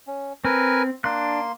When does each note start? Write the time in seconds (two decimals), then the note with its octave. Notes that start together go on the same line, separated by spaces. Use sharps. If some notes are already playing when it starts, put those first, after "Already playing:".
0.07 C#4
0.45 C4 A#4 B4 G#5
1.04 A#3 D4 C6 F#6